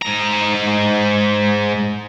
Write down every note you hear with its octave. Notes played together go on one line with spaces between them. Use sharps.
G#2 A#5